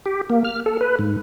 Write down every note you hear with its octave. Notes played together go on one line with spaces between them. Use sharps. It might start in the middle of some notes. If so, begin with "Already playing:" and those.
G4
A#3
F6
A4
B4
G#2